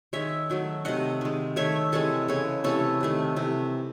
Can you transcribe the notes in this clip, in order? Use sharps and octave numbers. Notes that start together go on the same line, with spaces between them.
D#3 G#3 C#5 E5
D#3 F#3 A3
C3 D#3 A3 D#5 F#5
D#3 G#3
D#3 A3 C#5 E5
C3 E3 G#3 A4 C#5
C#3 E3 G#3 A4 C#5
C3 E3 A3 A4 C#5
C3 D#3 A3
C3 E3 A3